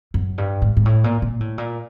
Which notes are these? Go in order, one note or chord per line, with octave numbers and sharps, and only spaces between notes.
F#2
G2
G#2
G#2
A2
A#2
A#2
A2
A#2